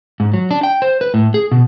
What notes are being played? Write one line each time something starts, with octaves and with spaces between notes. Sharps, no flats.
G#2
F#3
D4
G5
C5
B4
A2
G#4
B2